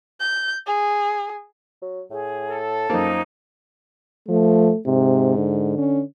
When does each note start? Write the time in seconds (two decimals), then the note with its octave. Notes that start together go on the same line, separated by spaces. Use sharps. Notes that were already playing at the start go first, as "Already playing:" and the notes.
0.20 G6
0.67 G#4
1.82 F#3
2.11 A2 G#4
2.49 A4
2.90 F#2 F3 A#3 D#4
4.29 F3 A3
4.86 G#2 C3
5.37 D3
5.78 C#4